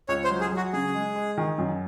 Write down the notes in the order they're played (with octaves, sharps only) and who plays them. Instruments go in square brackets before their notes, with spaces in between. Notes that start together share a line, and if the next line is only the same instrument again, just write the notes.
[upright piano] C#2 [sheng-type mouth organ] C#5
[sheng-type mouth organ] C5
[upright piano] F#3
[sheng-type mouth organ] G#4
[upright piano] F#3 [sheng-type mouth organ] F#4
[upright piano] C#3 [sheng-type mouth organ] G#4
[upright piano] G#3
G#3
D#3
F#2